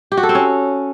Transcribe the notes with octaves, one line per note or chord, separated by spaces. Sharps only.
G4
F#4
A4
C4
C#4